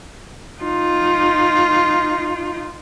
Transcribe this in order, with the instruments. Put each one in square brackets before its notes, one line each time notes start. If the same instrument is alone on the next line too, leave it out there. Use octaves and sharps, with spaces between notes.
[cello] D#4 F4